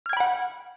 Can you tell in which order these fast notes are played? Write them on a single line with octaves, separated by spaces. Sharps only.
F6 G#6 G5 B5 F#5